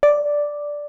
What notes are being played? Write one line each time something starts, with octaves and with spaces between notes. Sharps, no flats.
D5